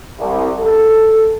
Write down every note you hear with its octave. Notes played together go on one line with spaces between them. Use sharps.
C2
A4